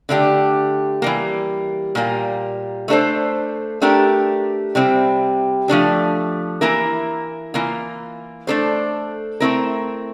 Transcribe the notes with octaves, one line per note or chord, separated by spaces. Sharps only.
D3 A3 D4 G4
E3 G3 A#3
A#2 G3 A#3
A3 D4 A4 C5
A3 D4 G4 A#4
C3 G3 C4 E4
F3 A3 D4 G4
E3 A#3 E4 A#4
E3 A#3 F4
A3 D4 A4 C5
A3 C4 E4 A#4